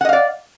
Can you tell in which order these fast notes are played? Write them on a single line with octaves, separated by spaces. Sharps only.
F#5 D#5 F5 D5